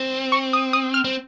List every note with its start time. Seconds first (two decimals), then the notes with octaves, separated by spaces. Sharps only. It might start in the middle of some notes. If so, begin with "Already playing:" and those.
Already playing: C4
0.32 C#6
0.53 D#6
0.73 D#6
0.94 F6
1.04 C4